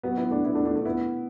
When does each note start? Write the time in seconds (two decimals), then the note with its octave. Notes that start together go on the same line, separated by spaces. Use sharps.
0.03 F#3 B3
0.17 B3 E4
0.31 A3 D4
0.44 B3 E4
0.55 A3 D4
0.65 A3 D4
0.76 A3 D4
0.85 B3 E4